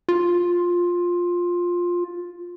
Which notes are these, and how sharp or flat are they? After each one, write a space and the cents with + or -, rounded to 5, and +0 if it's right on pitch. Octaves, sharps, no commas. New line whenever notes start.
F4 +10